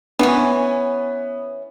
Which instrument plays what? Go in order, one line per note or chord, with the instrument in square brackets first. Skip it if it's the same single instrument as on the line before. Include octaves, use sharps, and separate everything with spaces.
[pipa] E3 C#4 [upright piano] B3